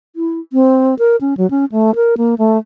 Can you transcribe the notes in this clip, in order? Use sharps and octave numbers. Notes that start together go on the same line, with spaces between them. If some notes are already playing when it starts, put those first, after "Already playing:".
E4
C4
A#4
C#4
F#3
C#4
A3
A#4
A#3
A3